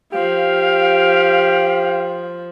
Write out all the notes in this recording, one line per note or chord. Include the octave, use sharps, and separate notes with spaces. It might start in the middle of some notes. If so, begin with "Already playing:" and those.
F3 G4 F5